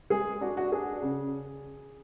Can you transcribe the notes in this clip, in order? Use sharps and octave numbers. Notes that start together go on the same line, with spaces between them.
G#3 G#4
D4 F#4
F#4
D4 G#4
C#3